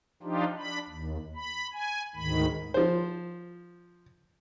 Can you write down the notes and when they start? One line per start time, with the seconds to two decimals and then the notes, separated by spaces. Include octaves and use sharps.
0.23 F3 D4 D#4 F4 G4
0.58 D4 B5
0.89 D#2
1.36 B5
1.73 G#5
2.16 D2 G#2 D#3 B5
2.74 F3 C5